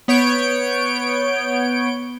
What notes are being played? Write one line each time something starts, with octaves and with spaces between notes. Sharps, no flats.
B3 C#5 G6 D7